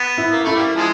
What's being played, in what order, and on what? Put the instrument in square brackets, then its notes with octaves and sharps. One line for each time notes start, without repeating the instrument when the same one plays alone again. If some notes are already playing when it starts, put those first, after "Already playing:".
Already playing: [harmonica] B3
[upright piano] E4
[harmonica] A#3
[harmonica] A3 [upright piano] E4
[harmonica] G3 A#3
F3 G#3